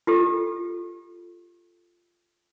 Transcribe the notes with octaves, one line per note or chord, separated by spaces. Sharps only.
F4 G4 A4